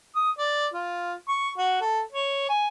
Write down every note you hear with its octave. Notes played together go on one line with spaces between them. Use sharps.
D#6
D5
F4
C#6
F#4
A4
C#5
G#5